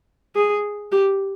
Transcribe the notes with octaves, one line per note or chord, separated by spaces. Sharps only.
G#4
G4